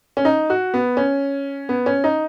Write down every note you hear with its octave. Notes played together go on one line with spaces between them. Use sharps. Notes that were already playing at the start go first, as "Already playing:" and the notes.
C#4
D#4
F#4
B3
C#4
B3
C#4
D#4